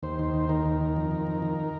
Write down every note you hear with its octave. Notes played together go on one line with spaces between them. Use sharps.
D#2 C5
D#3
D#2
D#3 A#4
D#2
D#3
F2
D#3
F2
D#3